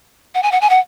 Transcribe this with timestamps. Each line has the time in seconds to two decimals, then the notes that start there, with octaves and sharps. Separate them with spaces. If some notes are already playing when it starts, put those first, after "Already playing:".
0.35 F#5
0.43 G#5
0.52 F#5
0.61 G#5
0.70 F#5